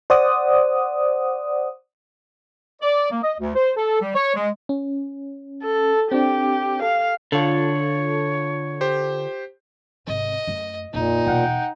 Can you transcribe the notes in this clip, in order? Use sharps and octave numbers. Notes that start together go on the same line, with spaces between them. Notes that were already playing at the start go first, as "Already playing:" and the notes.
C5 D5 F#5 D#6
D5
A#3
D#5
D2
C5
A4
G3
C#5
G#3
C#4
A4
C4 D4 G4
A4 F5
D3 F4 A4 C#5
G4 C5
G#1 C3 D#5
F#2 A3
A#1 F2 A#2 D#4
E2 B2 F#5 G5